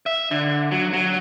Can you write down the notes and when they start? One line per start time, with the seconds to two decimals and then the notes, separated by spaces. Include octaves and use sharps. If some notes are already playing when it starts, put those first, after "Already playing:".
0.06 E5
0.31 D3
0.71 F#3
0.93 F#3